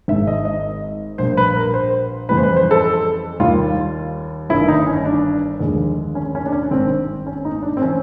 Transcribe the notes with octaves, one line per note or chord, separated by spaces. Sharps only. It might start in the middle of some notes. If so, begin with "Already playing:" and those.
G#1 G#2 D#3 G#3 E5
D#5
D#5
A#1 A#2 G3 C5
B4
A#4
C5
F2 C#3 E3 G3 B4
C5
B4
C5
A4
D#2 D#3 G3 F4
G1 G2 D#3 E4
D#4
C#4
D4
D#2 D3 F3 G#3
C#4
C#4
D4
C#4
G#1 G2 D#3 C4
C#4
D#4
D4
C4
E3 C#4